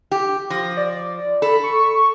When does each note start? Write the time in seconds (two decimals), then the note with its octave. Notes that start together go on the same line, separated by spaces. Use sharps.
0.12 G4
0.50 F3 A#6
0.77 D5
1.42 A4 B5
1.64 C#6